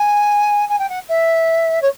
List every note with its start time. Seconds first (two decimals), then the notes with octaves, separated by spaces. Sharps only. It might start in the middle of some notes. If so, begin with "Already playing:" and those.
Already playing: G#5
0.69 G#5
0.79 G5
0.89 F#5
1.08 E5
1.82 C#5